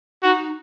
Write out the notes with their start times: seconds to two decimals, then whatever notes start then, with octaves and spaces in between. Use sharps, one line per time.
0.23 D#4 F#4